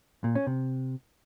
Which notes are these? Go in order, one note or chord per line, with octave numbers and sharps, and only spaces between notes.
A#2
C#4
C3